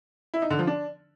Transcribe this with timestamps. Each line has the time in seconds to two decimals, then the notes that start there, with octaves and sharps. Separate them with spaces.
0.34 E4
0.42 D#4
0.50 D3
0.59 F3
0.67 D4